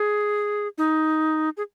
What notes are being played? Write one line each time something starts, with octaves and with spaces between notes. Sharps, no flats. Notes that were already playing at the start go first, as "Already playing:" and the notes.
Already playing: G#4
D#4
G#4